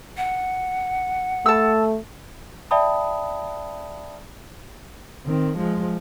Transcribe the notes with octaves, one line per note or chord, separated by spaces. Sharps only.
F#5
A3 A5 E6
D5 E5 G5 A5 B5 D#6
D#3 C4
F3 G#3